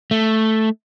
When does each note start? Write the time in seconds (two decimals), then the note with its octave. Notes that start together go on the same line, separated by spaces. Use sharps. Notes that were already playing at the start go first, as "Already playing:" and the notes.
0.11 A3